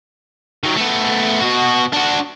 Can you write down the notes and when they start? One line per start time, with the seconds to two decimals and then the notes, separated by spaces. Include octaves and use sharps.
0.63 D#3 F#3
0.76 A3 B3
1.41 B2 F#4
1.93 D4 F#4